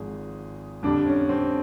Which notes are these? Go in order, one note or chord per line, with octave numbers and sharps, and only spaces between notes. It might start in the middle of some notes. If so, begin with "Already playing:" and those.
Already playing: G#1 G#2 F3 G#4
F2 D3 G3 D4
C#4
C4